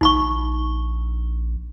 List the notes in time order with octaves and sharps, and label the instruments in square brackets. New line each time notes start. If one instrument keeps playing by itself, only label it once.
[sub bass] A#1 [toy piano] D#4 B5 C#6